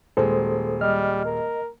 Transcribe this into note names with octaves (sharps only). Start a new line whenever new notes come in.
D#1 G#3 A4 C5
G3 D#5 F6
A#4